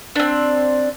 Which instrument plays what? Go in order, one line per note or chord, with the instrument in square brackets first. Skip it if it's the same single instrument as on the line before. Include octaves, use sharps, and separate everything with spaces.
[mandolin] C4 D4